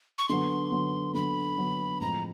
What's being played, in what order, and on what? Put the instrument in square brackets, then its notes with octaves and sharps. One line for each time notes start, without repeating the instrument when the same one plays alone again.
[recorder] C#6
[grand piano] D3 F#3 B3 [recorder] C6
[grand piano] D3 F#3 B3
[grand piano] D3 F#3 B3 [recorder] B5
[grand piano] D3 F#3 B3
[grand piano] A2 F3 G#3 C4 [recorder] A#5